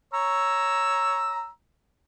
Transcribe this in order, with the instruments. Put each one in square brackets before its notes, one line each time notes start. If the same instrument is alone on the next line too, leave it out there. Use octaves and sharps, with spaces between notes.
[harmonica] C#5 A#5 E6